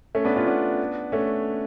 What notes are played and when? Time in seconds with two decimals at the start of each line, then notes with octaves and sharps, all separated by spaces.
0.15 A3 C#4
0.25 B3 D4
0.36 C#4 F4
0.47 B3 D4
1.12 A3 C#4